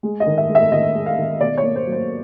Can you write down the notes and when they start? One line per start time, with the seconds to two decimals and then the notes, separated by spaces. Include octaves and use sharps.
0.03 G#3
0.20 D#5
0.26 D#3
0.38 E5
0.49 G#3
0.55 E5
0.72 D#3 D#5
0.95 G#3
1.06 F5
1.17 D#3
1.41 B2 D5
1.58 C#5
1.63 A#3
1.76 C5
1.86 F#3
1.92 C5